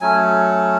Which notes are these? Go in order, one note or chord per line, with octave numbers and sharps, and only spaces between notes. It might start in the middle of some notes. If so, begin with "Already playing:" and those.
F#3 A3 C#4 G#5